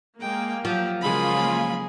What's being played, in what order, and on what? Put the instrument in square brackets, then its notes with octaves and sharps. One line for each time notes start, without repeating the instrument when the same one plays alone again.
[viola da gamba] G#3 [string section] A#3 [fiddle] G5
[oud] F3 [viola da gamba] F#3 [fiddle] G4
[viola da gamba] C#3 G#3 G#4 [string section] F#3 A#3 F4 [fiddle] B5